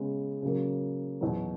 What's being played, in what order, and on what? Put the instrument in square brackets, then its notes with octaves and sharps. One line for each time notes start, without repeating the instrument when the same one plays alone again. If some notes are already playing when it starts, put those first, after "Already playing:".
Already playing: [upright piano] C#3 G#3 B3
C#3 F#3 A#3
E2 B2 F#3